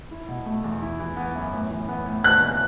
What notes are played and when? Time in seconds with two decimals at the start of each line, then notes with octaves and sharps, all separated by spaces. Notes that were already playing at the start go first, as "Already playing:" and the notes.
0.11 E4
0.28 B2
0.46 A3
0.64 E2
0.82 E4
1.00 E3
1.17 B3
1.35 F#2
1.53 A2
1.70 E3
1.88 B3
2.06 A2
2.24 B3 F#6
2.41 C#3